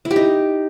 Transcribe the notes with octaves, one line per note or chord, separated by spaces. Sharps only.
E4
G4
D#4